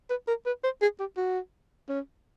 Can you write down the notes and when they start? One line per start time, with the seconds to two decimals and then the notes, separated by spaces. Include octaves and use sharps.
0.10 B4
0.28 A#4
0.46 B4
0.64 C5
0.82 G#4
0.99 G4
1.17 F#4
1.89 C#4